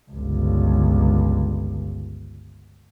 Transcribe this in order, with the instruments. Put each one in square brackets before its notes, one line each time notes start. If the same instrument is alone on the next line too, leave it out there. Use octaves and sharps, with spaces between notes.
[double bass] G1 C#2